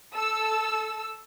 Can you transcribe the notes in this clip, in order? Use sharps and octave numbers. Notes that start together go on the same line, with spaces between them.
A4 E6